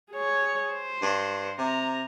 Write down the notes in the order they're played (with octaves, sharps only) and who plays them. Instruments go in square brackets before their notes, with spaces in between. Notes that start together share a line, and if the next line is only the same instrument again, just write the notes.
[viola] G#4 C#5
C5
[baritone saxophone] G2
[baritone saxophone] C3 [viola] A#5